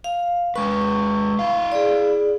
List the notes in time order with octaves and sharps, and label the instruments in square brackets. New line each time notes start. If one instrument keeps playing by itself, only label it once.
[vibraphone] F5
[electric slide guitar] G#3 B4 [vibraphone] C#6
[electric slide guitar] E4 F5
[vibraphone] G#4 D5